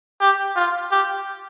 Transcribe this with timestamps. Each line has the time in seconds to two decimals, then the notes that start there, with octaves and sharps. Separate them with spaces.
0.21 G4
0.56 F4
0.91 G4